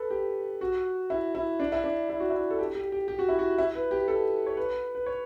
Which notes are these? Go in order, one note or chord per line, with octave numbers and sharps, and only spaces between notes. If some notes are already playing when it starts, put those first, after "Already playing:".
Already playing: A4 B4
G4
F#4
E4
E4
D4
E4
D4
E4
F#4
E4
A4
G4
G4
G4
G4
F#4
E4
F#4
E4
B4
G4
A4
C#5
B4
B4
C#5